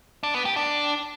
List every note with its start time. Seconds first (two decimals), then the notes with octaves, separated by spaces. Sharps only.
0.23 D4
0.34 B3
0.45 G4
0.56 D4